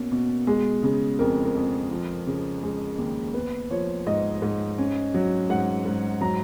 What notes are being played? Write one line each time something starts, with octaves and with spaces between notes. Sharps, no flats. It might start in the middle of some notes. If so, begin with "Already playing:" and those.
Already playing: B2 A#3 C#4
B2
G#3
C#3
F2 A#4
A#4
F2
F3
C#3
G#3
D#2
B3 B4
F3 C#5
G#2 D#5
G#2
C#4
F#3
G#2 F#5
G#2
F#3 A#5